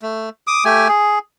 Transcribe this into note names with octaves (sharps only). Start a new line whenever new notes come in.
A3
D6 D#6
A3 G4 G#5
G#4